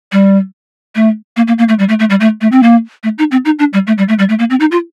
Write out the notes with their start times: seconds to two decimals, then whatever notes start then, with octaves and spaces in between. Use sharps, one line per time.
0.12 G3
0.95 A3
1.37 A#3
1.48 A#3
1.58 A#3
1.69 A3
1.79 G3
1.89 A3
1.99 A3
2.10 G3
2.21 A3
2.41 A3
2.52 C4
2.63 A#3
3.03 A3
3.19 D#4
3.32 C4
3.45 D#4
3.59 D4
3.73 G3
3.87 A3
3.98 G3
4.09 A3
4.19 G3
4.29 A3
4.39 A#3
4.50 C4
4.60 D#4
4.72 F4